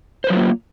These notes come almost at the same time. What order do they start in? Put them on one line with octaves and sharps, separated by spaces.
C5 B4 F#3 F4 A#3